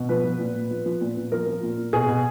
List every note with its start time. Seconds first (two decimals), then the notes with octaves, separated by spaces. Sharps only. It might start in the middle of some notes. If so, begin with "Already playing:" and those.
Already playing: B2
0.09 F3 B4
0.24 F3
0.40 A#2
0.56 A#2
0.71 F3
0.86 F3
1.01 A#2
1.17 A#2
1.32 F3 A#4
1.47 F3
1.63 A#2
1.77 A#2
1.93 B2 G#4
2.08 B2